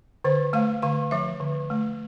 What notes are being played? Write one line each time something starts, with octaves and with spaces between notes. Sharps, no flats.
D3 C5
A3 F5
D3 F5
F3 E5
D3
A3